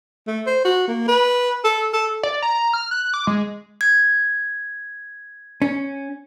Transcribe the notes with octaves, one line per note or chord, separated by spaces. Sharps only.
A3
C5
F#4
A#3
B4
A4
A4
D5
A#5
F6
F#6
D6
G#3
G#6
C#4